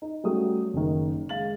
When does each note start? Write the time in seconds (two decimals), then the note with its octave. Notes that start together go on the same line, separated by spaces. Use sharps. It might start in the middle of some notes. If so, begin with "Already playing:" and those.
0.02 D#4
0.24 F#3 G3 A3 C#4 F#4 D#6
0.74 F#1 D#3
1.29 G#3 F5 A6 F#7